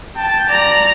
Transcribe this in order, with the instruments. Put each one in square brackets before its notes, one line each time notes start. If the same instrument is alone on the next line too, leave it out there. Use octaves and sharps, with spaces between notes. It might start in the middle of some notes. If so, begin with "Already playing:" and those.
[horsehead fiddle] G5 [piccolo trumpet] A5
[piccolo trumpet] D5 [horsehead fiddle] A#5